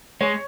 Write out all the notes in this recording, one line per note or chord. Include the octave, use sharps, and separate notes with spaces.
G#3 C#5